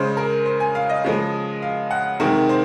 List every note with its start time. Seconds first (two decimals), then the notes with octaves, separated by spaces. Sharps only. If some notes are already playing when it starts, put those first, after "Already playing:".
Already playing: C#3 G#3 C5
0.17 A#4
0.45 C5
0.60 G#5
0.75 F5
0.89 D#5
1.04 C#3 F3 G#3
1.62 F5
1.91 F#5
2.20 C3 D#3 G#3 A#4
2.49 C5